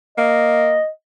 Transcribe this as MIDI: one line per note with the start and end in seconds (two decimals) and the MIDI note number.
0.18 0.78 58
0.18 0.87 75